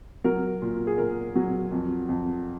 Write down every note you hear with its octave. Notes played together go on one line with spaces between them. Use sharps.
F#3 A#4
A#2
G#4
A#2 A#4
F#3
F2
F2